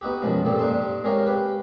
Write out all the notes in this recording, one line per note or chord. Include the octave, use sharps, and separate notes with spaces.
B3 D#4 F#4 G4
F#2 B2 F3 G#3 F4
A#2 C4 G4 A4
G2 D4 D#4 A5 C6
G#3 C4 G4 A#4 C#5 F5
G4 B4